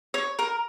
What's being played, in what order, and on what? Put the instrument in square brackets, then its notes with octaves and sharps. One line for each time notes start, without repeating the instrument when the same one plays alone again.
[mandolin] C#5
A#4